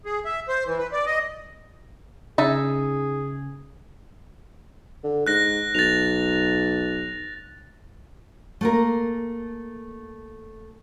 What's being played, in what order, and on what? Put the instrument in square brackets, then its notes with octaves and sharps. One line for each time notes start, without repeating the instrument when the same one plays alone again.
[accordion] G#4
E5
C5
E3
B4
D5
D#5
[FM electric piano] C#3 C#4 [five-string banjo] D#4 E5 A5 [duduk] G#4
[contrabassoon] D3
[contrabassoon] G#2 [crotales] F#6 A#6
[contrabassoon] B1 [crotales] A6 F7
[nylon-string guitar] A3 A#3 A#4